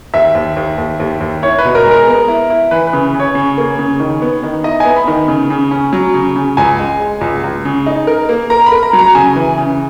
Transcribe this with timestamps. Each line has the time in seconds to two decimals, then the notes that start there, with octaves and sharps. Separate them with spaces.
0.14 D#2 E5
0.35 D#2
0.57 D#2
0.78 D#2
1.00 D#2
1.21 D#2
1.42 E4 C#5
1.58 B4
1.64 B2
1.75 A#4
1.85 G#3
1.91 A#4
2.07 B3
2.28 E4
2.50 E4
2.71 E3 B4
2.87 B4
2.93 C#3
3.14 C#3
3.20 C#5
3.35 C#3
3.58 A#3
3.79 C#3
4.00 D#3
4.22 B3
4.43 D#3
4.64 E4 D#5
4.80 B3 G#5
4.96 B5
5.08 D#3
5.28 C#3
5.50 C#3
5.71 C#4
5.93 F#3
6.14 C#3
6.36 C#3
6.57 C#2 G#5
6.79 G#3
7.00 G#3
7.21 C#2
7.44 C#2
7.65 C#3
7.86 D#4
8.07 A#4
8.29 A#3
8.50 A#4 A#5
8.66 B5
8.72 A#4
8.83 A#5
8.93 F#3
8.99 A#5
9.15 C#3 G#5
9.36 E3
9.58 C#3